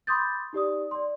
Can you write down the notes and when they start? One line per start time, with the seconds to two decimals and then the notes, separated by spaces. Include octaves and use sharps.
0.07 B5 C6 D6 D#6 G6 A6
0.53 D#4 G4 D5 D#6
0.91 D5 C6